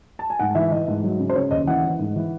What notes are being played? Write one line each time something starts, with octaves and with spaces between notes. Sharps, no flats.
A5
G#5
G#2 F#5
E3 E5
E3 D#5
G#2
F#3
C#3
C5
C#3 C#5
D#2 D#5
E3 F#5
E3
G#2
E3